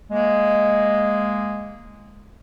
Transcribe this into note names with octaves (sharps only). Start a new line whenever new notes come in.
G#3 A#3